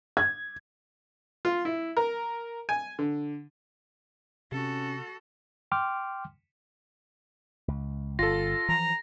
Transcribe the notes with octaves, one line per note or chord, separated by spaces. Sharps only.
G#6
F4
E4
A#4
G#5
D3
C3 C#4 F#4 A4
G5 C6 D6 F6
C#2
G1 F4 A4 A#6
E3 F3 A#5